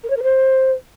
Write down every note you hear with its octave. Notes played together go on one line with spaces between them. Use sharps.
A#4
C#5
A#4
C5